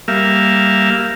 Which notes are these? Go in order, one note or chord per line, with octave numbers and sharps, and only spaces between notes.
G3 A#3 E5 F5